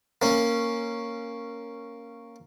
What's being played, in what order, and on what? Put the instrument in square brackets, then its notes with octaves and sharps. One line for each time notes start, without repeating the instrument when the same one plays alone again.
[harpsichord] A#3 C#4